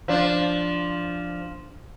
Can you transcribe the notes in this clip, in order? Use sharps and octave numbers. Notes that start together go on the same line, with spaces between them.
F3 D4